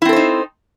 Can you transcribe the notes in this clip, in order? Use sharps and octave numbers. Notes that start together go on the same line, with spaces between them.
C4 D#4 E4 A4 C5